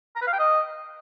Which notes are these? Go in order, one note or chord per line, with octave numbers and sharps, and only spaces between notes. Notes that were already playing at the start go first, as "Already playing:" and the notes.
A#5
B4
F5
G5
D#5